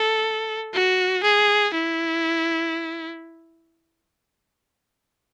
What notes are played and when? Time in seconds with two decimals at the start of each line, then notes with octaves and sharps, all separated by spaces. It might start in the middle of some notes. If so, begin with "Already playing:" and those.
Already playing: A4
0.73 F#4
1.23 G#4
1.74 E4